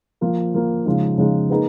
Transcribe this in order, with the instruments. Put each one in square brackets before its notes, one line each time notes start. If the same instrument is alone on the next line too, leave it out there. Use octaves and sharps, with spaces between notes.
[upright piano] F3 A#3 F4
F3 A#3 F4
C#3 F3 G#3 D#4
C#3 F3 G#3 D#4
A#3 D#4 G#4 B4